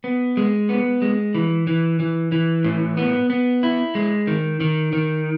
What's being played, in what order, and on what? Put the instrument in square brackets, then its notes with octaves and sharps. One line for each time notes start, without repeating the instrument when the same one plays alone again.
[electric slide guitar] B3
G#3
B3
G#3
E3
E3
E3
E3
A2
B3
B3
E4
G#3
D#3
D#3
D#3